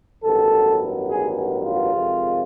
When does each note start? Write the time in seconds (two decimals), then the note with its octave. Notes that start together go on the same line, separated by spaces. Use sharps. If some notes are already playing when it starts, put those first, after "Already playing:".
0.24 A1 G2 D#3 F#3 B3 A4
1.09 G#4
1.65 F4
1.94 F2 C3 D#3 G#3